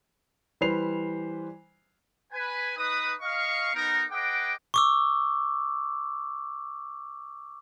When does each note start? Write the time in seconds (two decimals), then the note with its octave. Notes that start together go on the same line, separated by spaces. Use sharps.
0.61 E3 G3 B4 C5 C7 F7
2.33 B4 G#5
2.78 D#4 B4 D#6
3.21 D#5 F5 C#6
3.74 B3 D#4 A#4
4.11 G#4 B4 D#5 F#5 G5 D6
4.74 C#6 D6 E6